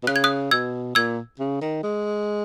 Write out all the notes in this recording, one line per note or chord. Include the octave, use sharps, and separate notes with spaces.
B2
C#3 F#6
G#6
D#6 F#6
B2 E6 G#6
A#2 E6 G#6
C#3
D#3
G#3